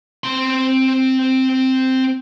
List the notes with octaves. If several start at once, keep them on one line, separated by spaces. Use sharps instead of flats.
C4 C6